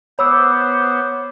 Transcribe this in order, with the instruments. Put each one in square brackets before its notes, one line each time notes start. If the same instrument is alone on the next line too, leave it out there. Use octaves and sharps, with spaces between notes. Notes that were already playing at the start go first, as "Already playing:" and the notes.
[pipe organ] B3 C5 [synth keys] C#5 D6 [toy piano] B5 E6